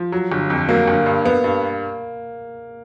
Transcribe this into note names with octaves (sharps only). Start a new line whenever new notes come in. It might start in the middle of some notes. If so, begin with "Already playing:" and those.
Already playing: F3
F#3
G1
F2
F#3 A#3
G1
G2
B3
G2